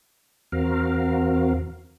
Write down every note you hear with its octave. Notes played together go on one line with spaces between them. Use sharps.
E2 C4 F#4 A#4 F5